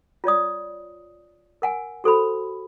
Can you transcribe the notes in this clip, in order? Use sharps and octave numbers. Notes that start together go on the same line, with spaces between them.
F4 C#5 D5 D#6
A#4 F#5 G#5
F#4 A4 C5 B5